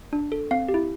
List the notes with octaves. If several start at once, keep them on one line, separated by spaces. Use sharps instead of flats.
D4
A4
C4 F5
G4
E4